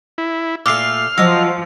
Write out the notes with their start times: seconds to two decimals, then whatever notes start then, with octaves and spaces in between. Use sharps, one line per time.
0.18 E4
0.66 A#2 A3 D6 E6 F6 C7
1.18 F3 F#3 D#5 E6